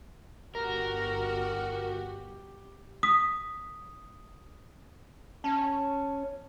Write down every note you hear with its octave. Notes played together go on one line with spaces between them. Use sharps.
G1 F#4 G4 A#4
D#6 B6
C#4 A5